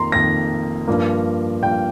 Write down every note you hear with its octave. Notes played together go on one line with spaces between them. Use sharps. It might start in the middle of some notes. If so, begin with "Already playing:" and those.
Already playing: F2 D#3 A#3 A#5 C6
F2 D#3 A#3 A#6
G2 F3 A#3
G2 F3 A#3 G5